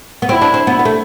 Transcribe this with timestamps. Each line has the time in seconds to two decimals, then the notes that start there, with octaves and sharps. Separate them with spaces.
0.22 B3
0.29 C4 E4
0.42 D4
0.54 C4
0.67 B3
0.79 B3
0.85 A3